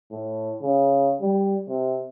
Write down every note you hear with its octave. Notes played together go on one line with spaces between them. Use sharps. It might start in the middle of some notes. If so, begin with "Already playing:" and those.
A2
C#3
G3
C3